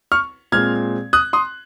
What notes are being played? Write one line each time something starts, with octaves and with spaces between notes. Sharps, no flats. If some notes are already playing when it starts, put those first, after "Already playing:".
C#6 F6
A#2 G#3 C4 F6 G#6
D#6 F#6
C6 D#6